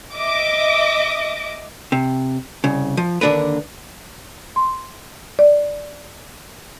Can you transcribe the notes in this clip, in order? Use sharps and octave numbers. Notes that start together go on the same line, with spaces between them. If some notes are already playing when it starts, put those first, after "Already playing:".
D#5 E5 D6
C3
C2 C#3
F3
D#2 D3 D4 A#4 B4
C6
D5